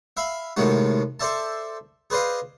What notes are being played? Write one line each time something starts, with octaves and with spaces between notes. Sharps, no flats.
E5 F5 B5
A2 C3 D#3 G#3 F#4
A4 C5 D5 E5 A5
G#4 B4 C5 D5 D#5 F5